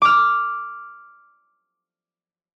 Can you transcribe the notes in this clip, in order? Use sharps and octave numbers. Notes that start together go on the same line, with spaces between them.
D6 F6